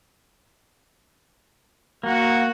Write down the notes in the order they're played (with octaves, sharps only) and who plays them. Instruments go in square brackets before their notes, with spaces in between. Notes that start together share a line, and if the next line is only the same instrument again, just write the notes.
[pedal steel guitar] A#3 [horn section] F#4